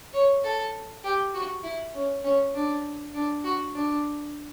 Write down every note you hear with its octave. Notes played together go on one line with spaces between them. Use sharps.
C#5
A4
G4
F#4
E4
C#4
C#4
D4
D4
F#4
D4